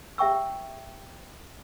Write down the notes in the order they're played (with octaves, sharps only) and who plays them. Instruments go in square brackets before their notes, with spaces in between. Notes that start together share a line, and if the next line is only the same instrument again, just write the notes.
[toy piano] G4 E5 G5 C#6 E6